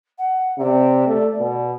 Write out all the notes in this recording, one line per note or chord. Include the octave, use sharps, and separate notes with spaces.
F#5
C3 D5
A3
B2